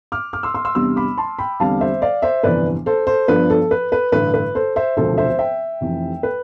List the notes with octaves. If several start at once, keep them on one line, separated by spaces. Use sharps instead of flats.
D6 F6
D6 F6
C6 E6
C6 E6
C6 E6
E2 C3 G3 B3 D4 C6 E6
B5 D6
A5 C6
G5 B5
E2 D3 G3 C4 F5 A5
C5 E5
D5 F5
C5 E5
G1 F2 C3 E3 B4 D5
A4 C5
A4 C5
G2 F3 B3 D4 B4
A4
B4
B4
A1 G2 D3 B4
B4
A4 C5
C5 E5
E1 D2 C3 F3 C4 A4 C5
C5 E5
E5 G5
F1 F2 C3 E3
B4